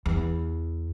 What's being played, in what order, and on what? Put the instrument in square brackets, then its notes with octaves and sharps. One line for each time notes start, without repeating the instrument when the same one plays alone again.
[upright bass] E2